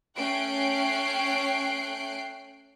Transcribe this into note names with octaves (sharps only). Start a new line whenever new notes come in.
A3 C#4 G5 F#6 C7 D7